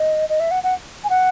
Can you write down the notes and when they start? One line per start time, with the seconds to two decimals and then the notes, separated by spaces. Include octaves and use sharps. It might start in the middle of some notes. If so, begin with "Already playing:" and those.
Already playing: D#5
0.29 D#5
0.40 E5
0.51 F#5
0.63 F#5
1.04 G#5
1.10 F#5